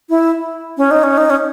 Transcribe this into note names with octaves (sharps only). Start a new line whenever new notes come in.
E4
C#4
D#4
C#4
D#4
C#4